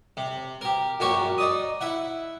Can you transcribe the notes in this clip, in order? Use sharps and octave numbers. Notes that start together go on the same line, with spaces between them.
C3
G4 A#4
A#1 F#2 F#4 G4 A#4 C#6
D#4 D5 D#6
E4 E5 F#5